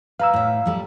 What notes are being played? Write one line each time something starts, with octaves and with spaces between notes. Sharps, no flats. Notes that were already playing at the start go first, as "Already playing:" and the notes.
B4 F5 A#5 E6
A2 E5
F3 G3 A4